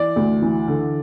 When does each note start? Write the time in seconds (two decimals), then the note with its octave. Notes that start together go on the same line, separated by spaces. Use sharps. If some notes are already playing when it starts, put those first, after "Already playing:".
Already playing: E3 D5
0.16 D2
0.42 E3
0.68 D3